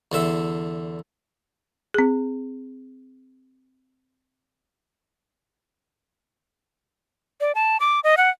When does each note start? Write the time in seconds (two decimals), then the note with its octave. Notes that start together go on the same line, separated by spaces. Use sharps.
0.12 E2 D3 E5
1.94 C4 G#4
7.41 D5
7.55 A5
7.80 D6
8.04 D#5
8.17 F#5